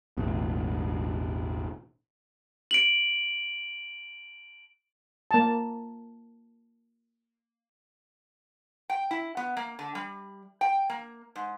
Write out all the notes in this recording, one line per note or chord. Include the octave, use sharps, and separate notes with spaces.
E1 A1
D7 F#7
A#3 A5
G5
E4
B3
A#3
D3
G3
G5
A#3
G#2